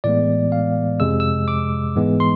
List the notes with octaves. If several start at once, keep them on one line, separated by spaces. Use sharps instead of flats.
A2 E3 G#3 B3 D5
F5
F2 C3 G#3 E6
E6
D6
G#2 E3 G#3 B3
C6